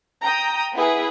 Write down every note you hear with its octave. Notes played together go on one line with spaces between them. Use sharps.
G5 A#5 D#6
B3 E4 G#4 B4